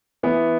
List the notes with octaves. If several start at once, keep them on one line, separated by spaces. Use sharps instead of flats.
E3 B3